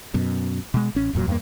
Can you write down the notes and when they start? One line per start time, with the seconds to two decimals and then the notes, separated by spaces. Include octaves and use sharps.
0.14 F#2 B2
0.74 B2 G#3
0.95 A1 C#4
1.13 D1 F2 A#2 F#3
1.28 E2 G2 G#3 A#3